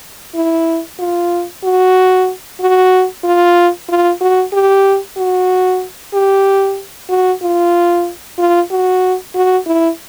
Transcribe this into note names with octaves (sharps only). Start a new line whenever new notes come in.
E4
F4
F#4
F#4
F4
F4
F#4
G4
F#4
G4
F#4
F4
F4
F#4
F#4
E4